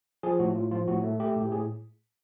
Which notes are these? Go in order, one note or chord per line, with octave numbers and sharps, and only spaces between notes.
F3 G#4
A2 F#4
A2 F4
F3 F4
A2 F#4
A3
A3 G4
A2 G4
A2 G#4